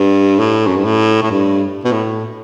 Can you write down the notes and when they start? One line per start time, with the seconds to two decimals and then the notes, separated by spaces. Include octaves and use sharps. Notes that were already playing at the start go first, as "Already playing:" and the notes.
Already playing: G2
0.39 A2
0.67 F#2
0.76 G2
0.84 A2
1.23 A2
1.30 G2
1.84 B2
1.92 A2